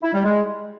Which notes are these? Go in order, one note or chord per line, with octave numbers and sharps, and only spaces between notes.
E4
G3
G#3